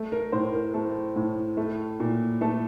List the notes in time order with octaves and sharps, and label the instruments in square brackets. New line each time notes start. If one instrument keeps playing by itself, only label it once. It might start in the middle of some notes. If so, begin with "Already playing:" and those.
Already playing: [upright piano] A3
A#4
A2 C5
A#4
A3 A4
A2
A3
A#2
A3 A4